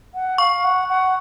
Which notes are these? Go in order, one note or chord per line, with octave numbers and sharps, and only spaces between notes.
F#5
F5 C#6
F#5
F#5